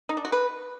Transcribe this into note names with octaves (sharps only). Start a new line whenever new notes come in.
D#4
D4
F#4
B4